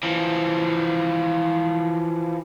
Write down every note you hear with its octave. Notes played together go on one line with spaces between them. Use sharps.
E3 F3